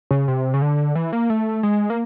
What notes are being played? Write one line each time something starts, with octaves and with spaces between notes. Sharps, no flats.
C#3
C3
C#3
D3
E3
A#3
A3
G#3
A#3